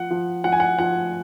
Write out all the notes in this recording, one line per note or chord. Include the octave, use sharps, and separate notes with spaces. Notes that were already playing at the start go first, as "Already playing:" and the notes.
Already playing: F3 F#5
F3
F3 F#5
G#5
F#5
F3 F#5